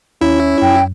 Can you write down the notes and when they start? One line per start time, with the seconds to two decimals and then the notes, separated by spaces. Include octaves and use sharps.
0.21 D#2 C#4 E4
0.62 F#2 G5